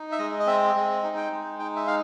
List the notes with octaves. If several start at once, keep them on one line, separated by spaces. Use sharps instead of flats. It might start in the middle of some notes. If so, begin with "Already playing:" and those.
Already playing: D#4
E5
G#3 D#5
D#5
C4 E5
G#3
D#4
G5
G#3
D#4 G5
E5
D#4 F5